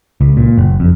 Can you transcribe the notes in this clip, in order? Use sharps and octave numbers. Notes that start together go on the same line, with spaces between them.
C#2
A#2
F#1
F2